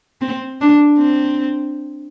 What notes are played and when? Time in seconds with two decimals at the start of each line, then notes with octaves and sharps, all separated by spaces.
0.21 C4
0.61 D4
0.98 C4